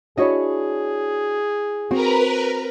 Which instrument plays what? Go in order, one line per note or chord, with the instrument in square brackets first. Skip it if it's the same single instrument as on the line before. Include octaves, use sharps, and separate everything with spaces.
[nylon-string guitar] D4 F#4 [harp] E4 C#5 D#5 [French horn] G#4
[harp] C4 [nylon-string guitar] F#4 [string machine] A#4 B4 A#5